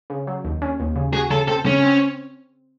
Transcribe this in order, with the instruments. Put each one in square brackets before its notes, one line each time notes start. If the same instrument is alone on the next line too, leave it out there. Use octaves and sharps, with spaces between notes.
[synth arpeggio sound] C#3
F#3
D#2
C#4
D#2
C#3
[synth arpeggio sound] F#4 [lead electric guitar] G#4
[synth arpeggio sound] C#3 [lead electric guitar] A4
[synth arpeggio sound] C4 [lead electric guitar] A4
[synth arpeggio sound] C#3 [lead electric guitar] C#4
[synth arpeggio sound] C4